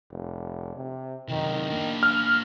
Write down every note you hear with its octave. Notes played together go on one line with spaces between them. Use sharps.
F1
C3
F#2 C3 D#3
A#3 D4
F6